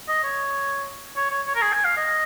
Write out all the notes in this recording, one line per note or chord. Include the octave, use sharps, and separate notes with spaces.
D#5
C#5
C#5
C#5
C#5
A#4
G#4
G#5
F5
D#5